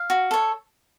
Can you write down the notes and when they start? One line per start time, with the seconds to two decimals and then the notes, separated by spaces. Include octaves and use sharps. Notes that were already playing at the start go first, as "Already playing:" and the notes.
Already playing: F5
0.10 F#4
0.31 A4 C#5